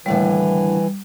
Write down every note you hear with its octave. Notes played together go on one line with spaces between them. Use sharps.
D#2 A2 D3 E3 G3